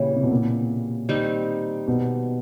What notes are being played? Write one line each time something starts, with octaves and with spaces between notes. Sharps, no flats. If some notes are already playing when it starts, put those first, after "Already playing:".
Already playing: A#2 C#3 E3 G3
C3
B2
A#2
D#3 G3 C4 D#4
B2